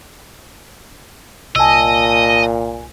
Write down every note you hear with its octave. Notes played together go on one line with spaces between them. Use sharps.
C2 A#2 D#5 G#5 A5 E6